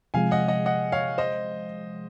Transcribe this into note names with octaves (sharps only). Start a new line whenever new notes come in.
C3 F3 G#3 F5 G#5
D#5 F#5
D#5 F#5
D#5 F#5
C#5 F5
C5 D#5